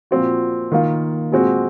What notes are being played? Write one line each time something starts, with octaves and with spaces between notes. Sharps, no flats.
A#2 F3 C4 F#4
D#3 A#3 F4
A#2 G#3 C4 F#4